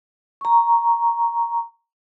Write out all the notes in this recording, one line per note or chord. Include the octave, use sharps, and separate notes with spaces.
A#5 C#6